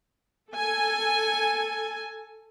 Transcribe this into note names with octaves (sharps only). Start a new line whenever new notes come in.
A4 G#5